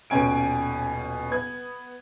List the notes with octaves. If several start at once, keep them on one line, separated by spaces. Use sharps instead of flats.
D#1 B2 C#4 G#5 D7
B3 G#6